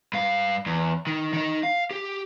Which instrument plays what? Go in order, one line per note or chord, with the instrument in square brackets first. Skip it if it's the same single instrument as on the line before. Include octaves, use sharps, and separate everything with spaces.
[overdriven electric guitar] G2 F5
E2
D#3
D#3 D#4
F5
G4